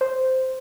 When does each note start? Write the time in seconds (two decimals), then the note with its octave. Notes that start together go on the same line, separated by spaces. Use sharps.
0.01 C5